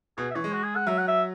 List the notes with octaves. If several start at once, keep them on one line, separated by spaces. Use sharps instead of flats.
B2 G#4
E5
E3 C#5
G#3
F#4
G#4
F#5
F#3 E5
F#5
E5